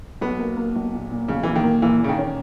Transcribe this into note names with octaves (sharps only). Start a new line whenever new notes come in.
B1 B3
A#3
A#3
B1
A#2
A#2
B1 C#3
A#2 E3
D#3
A#3
A#2 E3
A#2 C#3
D#3
C#4